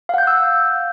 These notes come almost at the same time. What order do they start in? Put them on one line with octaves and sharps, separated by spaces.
F5 F#5 G6 F#6 E6